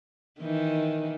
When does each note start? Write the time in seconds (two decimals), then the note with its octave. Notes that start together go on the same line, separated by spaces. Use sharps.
0.41 D#3 E3 D#4